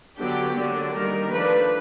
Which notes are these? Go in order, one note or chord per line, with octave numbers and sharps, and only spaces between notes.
D3 F#3 B3 D4 G4
D3 F#3 A#3 D4
D#3 G3 A#3 A#4
F3 A3 D4 B4